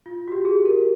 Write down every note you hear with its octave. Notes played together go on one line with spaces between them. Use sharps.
F4
F#4
G4
G#4
A#4